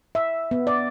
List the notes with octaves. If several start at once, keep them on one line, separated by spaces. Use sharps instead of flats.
E5
B3
D5